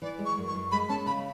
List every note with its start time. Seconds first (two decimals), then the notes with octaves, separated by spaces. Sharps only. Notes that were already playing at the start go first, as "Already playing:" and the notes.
0.02 E3 D5
0.19 G#3
0.26 C#6
0.37 F#2
0.48 C#6
0.54 F#2
0.72 G#3 B5
0.89 C#4 A5
1.06 C#3 B5